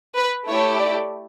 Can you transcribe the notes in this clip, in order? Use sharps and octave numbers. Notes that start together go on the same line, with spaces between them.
B4
A3 E4 G4 C#5
D5